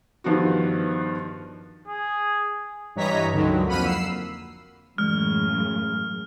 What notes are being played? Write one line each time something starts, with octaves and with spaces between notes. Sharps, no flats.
G2 D#3 F3 B3 D4 F#4
G#4
G2 E3 C#5 D#5 A#5 B6
C#2 D3 D#3 F#3
F2 A#3 F#5 B5 F6 D#7
E6 C7
F#2 A2 C#3 E3 G#3 F6